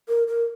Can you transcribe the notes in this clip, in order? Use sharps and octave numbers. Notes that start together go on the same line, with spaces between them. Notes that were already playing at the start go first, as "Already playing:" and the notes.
A#4
A#4